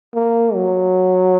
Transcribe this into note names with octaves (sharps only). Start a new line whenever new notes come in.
A#3
F#3